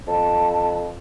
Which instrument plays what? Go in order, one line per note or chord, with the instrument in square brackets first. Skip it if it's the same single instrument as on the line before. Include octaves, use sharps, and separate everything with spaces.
[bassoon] F2 [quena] A5